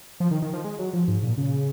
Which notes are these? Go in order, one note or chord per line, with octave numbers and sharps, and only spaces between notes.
F3
D#3
D#3
F3
G#3
F#3
F3
G#2
A#2
C#3